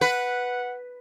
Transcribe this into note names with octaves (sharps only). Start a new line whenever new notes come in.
B4 F#5